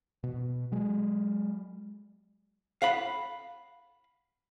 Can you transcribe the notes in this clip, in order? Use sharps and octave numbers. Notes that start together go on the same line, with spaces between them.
B2
F#3 G#3
F5 F#5 B5